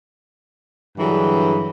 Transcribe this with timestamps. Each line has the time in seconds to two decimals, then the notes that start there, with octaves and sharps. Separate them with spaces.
0.98 G2 D3 E3 F#3 G#4